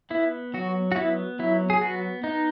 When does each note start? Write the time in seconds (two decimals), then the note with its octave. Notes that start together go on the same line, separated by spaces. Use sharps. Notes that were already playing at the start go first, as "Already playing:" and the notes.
0.10 B3 E4
0.54 F#3 F#4
0.92 F#4
0.96 B3 E4
1.39 F#3 E4
1.70 G#4
1.81 B3 F#4
2.23 B3 D#4